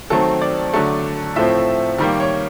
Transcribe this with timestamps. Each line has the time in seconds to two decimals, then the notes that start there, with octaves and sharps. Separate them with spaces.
0.10 D#3 F#3 A3 C4 A4
0.41 D5
0.74 D3 F#3 A3
1.36 A2 F3 A3 C4 E5
1.98 D#3 G3 A#3
2.20 C#5